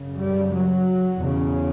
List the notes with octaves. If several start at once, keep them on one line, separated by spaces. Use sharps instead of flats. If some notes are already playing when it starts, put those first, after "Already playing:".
Already playing: F#2 C#3
G3
F#3
E2 C#3